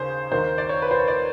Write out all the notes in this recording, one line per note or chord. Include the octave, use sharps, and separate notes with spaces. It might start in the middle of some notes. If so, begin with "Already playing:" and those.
Already playing: D#2 C#3 G#4 C5
D#2 D#3 C5
D5
C#5
B4
C5
C#5
D5